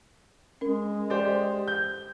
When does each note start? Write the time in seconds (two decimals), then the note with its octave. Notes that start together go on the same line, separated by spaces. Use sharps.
0.61 G#3 C#4 A#4
1.10 G4 C5 D5
1.68 G6